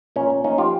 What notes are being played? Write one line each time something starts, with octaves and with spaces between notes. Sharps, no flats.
A#2 C#4
A#2
A#3 C#4 D#4
F3 F4 G4